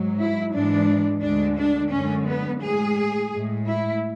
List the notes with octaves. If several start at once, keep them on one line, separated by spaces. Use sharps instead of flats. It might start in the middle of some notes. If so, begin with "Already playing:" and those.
Already playing: G#2 F#3
E4
G#2 E3 G#3 D4
D2 D3 G#3 D4
D4
F#2 D3 G#3 C#4
B3
A2 G#3 G#4
A2 G#3
E4